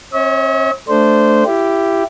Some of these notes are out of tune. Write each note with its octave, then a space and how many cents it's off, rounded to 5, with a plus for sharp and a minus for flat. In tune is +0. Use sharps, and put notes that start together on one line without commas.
C4 +45 C#5 +0 E5 -45
A3 +0 D4 +0 C5 -15
E4 +20 G4 +0